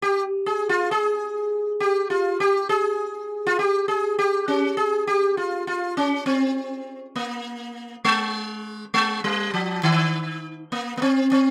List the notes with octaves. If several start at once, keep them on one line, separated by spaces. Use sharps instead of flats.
G4
G#4
F4
G#4
G4
F4
G4
G#4
F4
G4
G#4
G4
C#4
G#4
G4
F4
F4
C#4
C4
A#3
G#3
G#3
G3
F3
D#3
A#3
A#3
C4
C4